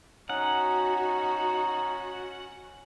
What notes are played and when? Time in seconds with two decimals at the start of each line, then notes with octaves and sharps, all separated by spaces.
0.30 C#4 D#4 F#4 F#5